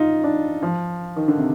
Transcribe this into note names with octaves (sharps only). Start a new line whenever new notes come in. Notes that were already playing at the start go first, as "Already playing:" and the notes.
Already playing: D#4 F4
D4
F3
D#3
D3
C3